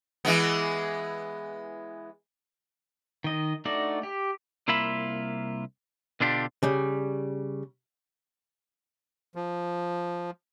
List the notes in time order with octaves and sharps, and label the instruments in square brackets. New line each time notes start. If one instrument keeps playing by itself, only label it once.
[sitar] E3 G#3 B3
[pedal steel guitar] D#3 D#5
A3 D4 D#4 F#4 D5
G4
[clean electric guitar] C2 A#3 E4 F4 E5 B5
B2 D3 D4 F4 G4
[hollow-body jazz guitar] C#3 G3
[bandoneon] F3